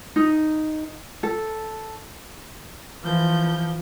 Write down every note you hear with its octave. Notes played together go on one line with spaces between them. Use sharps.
D#4
A4
E3 F3 G6